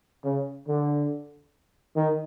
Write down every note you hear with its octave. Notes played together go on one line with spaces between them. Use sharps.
C#3
D3
D#3